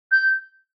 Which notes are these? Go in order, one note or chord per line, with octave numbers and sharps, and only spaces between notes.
G6